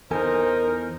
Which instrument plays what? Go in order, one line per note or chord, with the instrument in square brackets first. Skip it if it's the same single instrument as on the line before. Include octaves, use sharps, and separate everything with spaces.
[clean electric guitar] E2 A4 G#5 [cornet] D#4 [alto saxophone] A#4 [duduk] C5